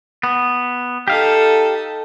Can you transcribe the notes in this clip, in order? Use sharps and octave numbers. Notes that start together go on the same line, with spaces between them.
B3
D#4 G4 A4 F5